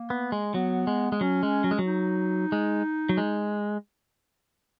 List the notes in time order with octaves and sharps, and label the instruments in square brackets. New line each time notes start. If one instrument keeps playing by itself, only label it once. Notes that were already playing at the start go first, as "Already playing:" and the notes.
Already playing: [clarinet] A#3
[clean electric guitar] B3
G#3
[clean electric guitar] F#3 [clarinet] B3
[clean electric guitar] G#3
G#3
[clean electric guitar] F#3 [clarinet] C#4
[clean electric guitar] G#3
F#3
G#3
F#3
[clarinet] D#4
[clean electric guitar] G#3
F#3
G#3